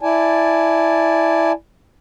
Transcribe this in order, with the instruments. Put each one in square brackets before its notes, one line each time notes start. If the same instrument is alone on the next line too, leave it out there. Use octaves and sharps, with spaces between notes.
[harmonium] E4 D5 G#5 A5